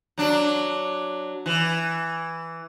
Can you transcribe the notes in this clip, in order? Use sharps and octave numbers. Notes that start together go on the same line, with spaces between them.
F#3 D4
E3